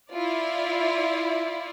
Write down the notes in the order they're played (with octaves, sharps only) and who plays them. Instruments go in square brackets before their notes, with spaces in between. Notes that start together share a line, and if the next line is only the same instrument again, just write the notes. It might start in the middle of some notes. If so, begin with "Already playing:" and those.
[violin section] E4 F4 D5